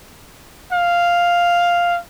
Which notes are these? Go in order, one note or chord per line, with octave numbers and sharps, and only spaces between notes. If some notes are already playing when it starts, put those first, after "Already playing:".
F5